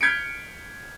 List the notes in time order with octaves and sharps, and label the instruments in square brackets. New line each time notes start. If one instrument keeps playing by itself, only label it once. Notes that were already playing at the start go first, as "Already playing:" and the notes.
[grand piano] F6 G6 G#6 B6 C#7 D7